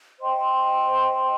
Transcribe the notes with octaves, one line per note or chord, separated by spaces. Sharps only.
C5 D#5 G5 C6